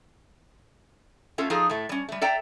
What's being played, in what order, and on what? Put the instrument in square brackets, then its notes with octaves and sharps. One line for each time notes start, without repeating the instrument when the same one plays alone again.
[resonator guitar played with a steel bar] A3 C#4 F4 A4
F3 D#4 F4 G#4 A4
A2 A3
G3 C#4
G3 A3
A4 D5 E5 G5 A#5